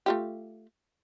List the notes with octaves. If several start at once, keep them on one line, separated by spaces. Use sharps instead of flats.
A3 F4 G4